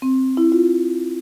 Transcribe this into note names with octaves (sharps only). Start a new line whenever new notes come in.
C4
E4
F4